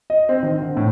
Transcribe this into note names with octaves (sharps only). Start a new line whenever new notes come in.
D#5
C4
D#3
D3
A2